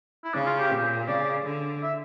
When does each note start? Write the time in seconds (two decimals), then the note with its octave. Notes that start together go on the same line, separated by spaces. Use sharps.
0.24 E4
0.34 C#3 D4
0.46 F4
0.59 G4
0.71 A#2
1.08 C#3 D5
1.45 D3
1.83 E5